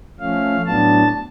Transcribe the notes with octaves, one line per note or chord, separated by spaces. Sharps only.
F3 A3 C#4 F5
A2 F#3 B3 D4 A5